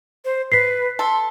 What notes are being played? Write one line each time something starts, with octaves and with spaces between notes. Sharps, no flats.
C5
B4 B6 C7
A4 C6